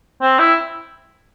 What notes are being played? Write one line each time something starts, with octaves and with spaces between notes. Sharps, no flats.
C4
E4